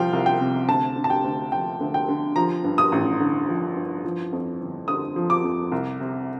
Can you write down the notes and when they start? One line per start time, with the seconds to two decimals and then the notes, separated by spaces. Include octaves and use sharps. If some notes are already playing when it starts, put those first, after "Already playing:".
Already playing: C2 C3 F3 F5 G5
0.13 C2
0.26 G5
0.41 C3
0.68 D2 A5
0.96 D3
1.04 A5
1.10 G5
1.24 D2
1.52 F3 G5
1.80 D2
1.94 G5
2.08 D3
2.36 F3 A#5
2.64 G2
2.78 D#6
2.92 A1
3.20 D3
3.49 F3
3.76 G2
4.05 F3
4.33 F2
4.61 G1
4.88 D3 D#6
5.16 F3
5.30 D6
5.44 F2
5.72 C2
6.00 C3